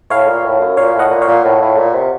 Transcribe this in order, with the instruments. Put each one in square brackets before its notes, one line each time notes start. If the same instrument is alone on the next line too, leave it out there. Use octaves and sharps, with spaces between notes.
[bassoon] A2 [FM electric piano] C#5 F5
[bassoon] A#2
A2
F#2
[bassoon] A#2 [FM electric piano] C#5 F5
[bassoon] A2
[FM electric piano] D#5 F#5
[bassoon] A#2
[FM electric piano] C#5 F5
[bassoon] A#2
A2
A2
A#2
C3